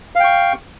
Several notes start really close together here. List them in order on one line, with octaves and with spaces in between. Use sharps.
F5 G5 C#6